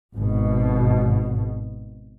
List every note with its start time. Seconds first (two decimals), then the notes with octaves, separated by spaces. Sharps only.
0.13 G#1 B2